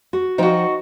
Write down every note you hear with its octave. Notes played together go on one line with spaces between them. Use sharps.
F#4
F3 D#4 F#4 C5 G5